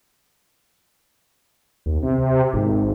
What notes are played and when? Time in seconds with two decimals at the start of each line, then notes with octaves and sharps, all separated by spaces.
1.86 D#2
2.03 C3
2.53 G#1